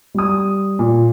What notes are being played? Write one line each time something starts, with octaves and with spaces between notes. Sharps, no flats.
G3 D#6
A#2